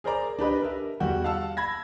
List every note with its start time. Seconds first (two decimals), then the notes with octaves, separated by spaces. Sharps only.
0.04 G#4 A#4 C5 D5 A#5 D6
0.39 D4 G4 B4 D#5
0.62 A#4 E5
1.00 E2 G3 F#4 G5
1.24 F5 F#5 A5 E6
1.57 B5 G#6 A#6